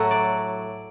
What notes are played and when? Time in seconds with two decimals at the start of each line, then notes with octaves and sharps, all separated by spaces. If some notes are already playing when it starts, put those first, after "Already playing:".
Already playing: A2 F#3 A3 F#5
0.11 D5